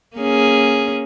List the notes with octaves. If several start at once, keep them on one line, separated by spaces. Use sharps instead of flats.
A#3 C#4 G#4